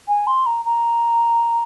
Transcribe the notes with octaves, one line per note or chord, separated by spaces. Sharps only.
G#5
C6
A#5
A#5